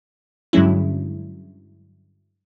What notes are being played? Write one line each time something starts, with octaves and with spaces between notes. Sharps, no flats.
G2 D3 F#3 G#3 C#4 E4